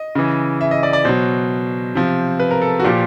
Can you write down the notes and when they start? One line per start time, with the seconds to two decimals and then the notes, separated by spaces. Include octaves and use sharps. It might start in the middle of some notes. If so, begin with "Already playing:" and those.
Already playing: D#5
0.15 C#3 E3
0.61 E5
0.71 D#5
0.83 D5
0.93 D5
1.05 B2 F#3 C5
1.95 C3 F3
2.40 B4
2.51 A#4
2.62 A4
2.80 F#4
2.84 A#2 F3 G4